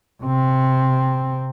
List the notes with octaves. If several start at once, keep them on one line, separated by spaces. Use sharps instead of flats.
C3 C4